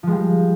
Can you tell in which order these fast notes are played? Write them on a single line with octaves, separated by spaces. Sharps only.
F3 G#3 G3